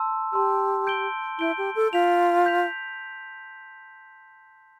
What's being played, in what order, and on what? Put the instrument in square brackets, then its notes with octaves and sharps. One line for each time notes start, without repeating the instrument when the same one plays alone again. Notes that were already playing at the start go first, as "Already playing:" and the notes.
Already playing: [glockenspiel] A5 C6 E6
[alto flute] G4 [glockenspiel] A5 C6 E6
[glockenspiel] G6 D7 G7
[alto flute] E4 [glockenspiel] G6 D7 G7
[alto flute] G4
A4
[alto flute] F4 [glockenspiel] G6 B6 F7
[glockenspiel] G6 B6 F7